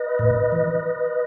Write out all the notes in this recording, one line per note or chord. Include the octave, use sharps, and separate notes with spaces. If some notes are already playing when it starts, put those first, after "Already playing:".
Already playing: B4 D#5
A2
E3